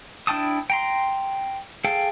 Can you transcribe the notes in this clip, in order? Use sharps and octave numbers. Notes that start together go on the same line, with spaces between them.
D4 E4 G5 A5 D#6
G5 A#5 C6
G#4 A4 F5 G5